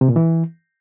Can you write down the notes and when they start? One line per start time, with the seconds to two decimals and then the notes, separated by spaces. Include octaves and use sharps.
0.01 C3
0.09 A#2
0.16 E3